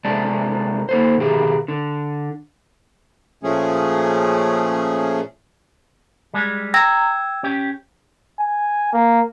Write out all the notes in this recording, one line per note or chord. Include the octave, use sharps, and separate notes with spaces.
C3 G#3 A3 D5 A5
A#3 A4 C5
B2 D#3 G4 G#4
D3
A#2 F3 A3 C#4 G#4
G3 G#3
G5 A#5 E6 G#6
C#4 G4
G#5
A#3